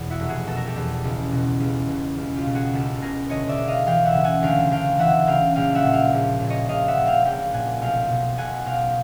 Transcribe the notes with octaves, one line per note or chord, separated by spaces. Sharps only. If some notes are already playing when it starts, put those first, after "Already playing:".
Already playing: E2 B2
E4 F#4
F1
F#4 G#4
B2 A4
A#4
G4 A4
E2
C#2
B2
C#2
B2
C#2
F4 G4
B2
F#4 G#4
C#2 G4 A4
B2 G#4 A#4
D2 C#5 D#5
D5 E5
D2
D#5 F5
E3 F5 G5
E5 F#5
C#3
F#5 G#5
D2 F5 G5
D2 F5 G5
E3 E5 F#5
C#3 F5 G5
A#1 F5 G5
E5 F#5
A#2
F5 G5
A#1
A#2
C#5 D#5
A#1 D#5 F5
E5 F#5
A#2
F5 G5
A#1 F5 G5
A#2 F#5 G#5
B1 F5 G5
B2
B1 F#5 G#5
B2 F5 G5